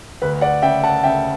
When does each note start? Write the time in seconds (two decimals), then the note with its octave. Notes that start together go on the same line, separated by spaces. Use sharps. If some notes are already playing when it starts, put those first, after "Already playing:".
0.22 D2 B4
0.41 D5 F#5
0.62 C#3 E5 G5
0.84 F#5 A5
1.04 C#3 E5 G5